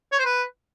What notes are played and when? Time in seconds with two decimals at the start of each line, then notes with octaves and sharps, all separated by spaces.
0.12 C#5
0.19 C5
0.25 B4